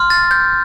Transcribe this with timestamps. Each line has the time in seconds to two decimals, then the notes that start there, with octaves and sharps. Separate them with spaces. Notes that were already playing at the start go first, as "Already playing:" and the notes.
Already playing: C6 F6
0.10 A6
0.31 G6